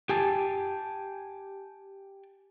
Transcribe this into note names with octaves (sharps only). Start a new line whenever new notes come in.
G4 G#5 A5